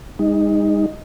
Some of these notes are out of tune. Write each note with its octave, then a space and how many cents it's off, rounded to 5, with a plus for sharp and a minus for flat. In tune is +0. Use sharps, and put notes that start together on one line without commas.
G#3 -40 D#4 +0